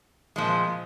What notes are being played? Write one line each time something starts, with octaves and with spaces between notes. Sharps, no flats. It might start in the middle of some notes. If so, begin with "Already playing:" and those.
A#2 F3 G#3